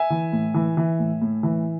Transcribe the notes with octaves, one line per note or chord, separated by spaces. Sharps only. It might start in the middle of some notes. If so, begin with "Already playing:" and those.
Already playing: E5 G#5
E3
A2
E3
E3
A2
A2
E3